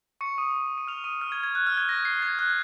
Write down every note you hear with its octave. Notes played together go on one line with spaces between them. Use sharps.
C#6 C#7
D#6 D#7
D#7
F6 F7
D#6 D#7
F6
G#6
G#6
F#6
F6
G#6
A#6
C7
G#6
F#6